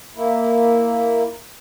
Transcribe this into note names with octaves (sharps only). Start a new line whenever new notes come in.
A#3 E4